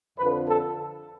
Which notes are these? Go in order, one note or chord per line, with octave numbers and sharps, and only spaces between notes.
F2 D3 F3 B4
A4